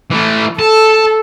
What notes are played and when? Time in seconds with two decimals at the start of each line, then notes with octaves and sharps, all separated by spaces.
0.10 E3 A3
0.59 A4 A5